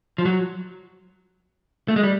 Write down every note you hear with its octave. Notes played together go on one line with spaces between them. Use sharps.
F3
F#3
A3
G#3
G3